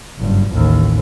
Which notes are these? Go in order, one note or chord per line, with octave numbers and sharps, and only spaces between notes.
F#1 G2
A1 D#2